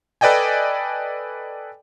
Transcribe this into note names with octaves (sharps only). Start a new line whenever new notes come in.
A4 B4 D5 D#5 G5 G#5